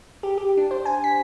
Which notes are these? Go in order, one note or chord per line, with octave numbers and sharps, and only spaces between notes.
G4
G4
D4
C5
G#5
B6